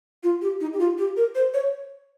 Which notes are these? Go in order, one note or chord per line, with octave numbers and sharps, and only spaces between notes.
F4
G4
D#4
G4
F4
G4
A#4
C5
C#5